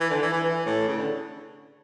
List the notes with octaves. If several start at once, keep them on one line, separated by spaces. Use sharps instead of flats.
E3
D3
E3
E3
E3
A2
C#3
D3